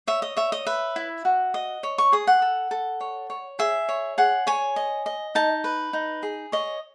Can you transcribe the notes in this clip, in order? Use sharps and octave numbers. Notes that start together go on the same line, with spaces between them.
C#5 E5
D#5
C#5 E5
D#5
B4 E5
E4
F#4
D#5
C#5
C#6
G#4 D#6
F#5
A4
A4
C#5
C#5
G#4 E5
C#5
G#4 F#5
C#5 G#5
D#5
D#5
D#4 A5
B4
D#4
G#4
C#5 D#5